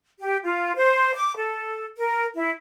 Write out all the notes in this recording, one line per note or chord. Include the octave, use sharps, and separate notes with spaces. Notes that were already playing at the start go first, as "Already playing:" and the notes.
G4
F4
C5
D6
A4
A#4
E4